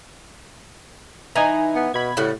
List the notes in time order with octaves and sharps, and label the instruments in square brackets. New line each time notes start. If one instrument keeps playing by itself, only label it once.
[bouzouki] E3 [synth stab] D#4 G#5 A#5
[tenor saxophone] B3
[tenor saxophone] B2 [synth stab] B5 G#6
[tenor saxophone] A2 [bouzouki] C#3 G3 F#4